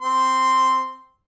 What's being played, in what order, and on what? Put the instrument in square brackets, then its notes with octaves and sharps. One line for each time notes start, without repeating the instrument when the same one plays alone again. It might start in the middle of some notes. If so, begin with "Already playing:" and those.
[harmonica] C4 C6